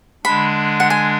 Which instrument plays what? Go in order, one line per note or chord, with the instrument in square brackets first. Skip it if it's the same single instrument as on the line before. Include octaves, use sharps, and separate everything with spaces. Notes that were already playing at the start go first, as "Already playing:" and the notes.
[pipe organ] D3 G#3 D4 [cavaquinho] B5
[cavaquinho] F#5
G#5